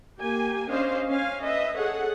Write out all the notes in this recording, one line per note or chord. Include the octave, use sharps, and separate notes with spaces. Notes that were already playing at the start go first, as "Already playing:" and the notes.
A#3 G4 G#5
C#4 D4 C5 D#5 F5
C#4 F5 G#5
B4 D#5 E5
G#4 A4 C#5 F#5